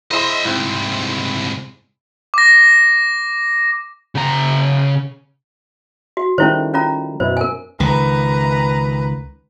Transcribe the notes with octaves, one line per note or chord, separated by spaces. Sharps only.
G#3 E4 C5 D#5 E5
C2 G#2 C4 E4
D6 A#6
C#3 A#5
F#4
D#3 G3 A3 C#4 E4 C5
C#4 F4 A#5
F#2 B2 E4 C5
A#4 G#5
C#2 D#3 B4 A#5